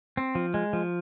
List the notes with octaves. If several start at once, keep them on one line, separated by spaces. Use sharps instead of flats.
C4
F3
G#3
F3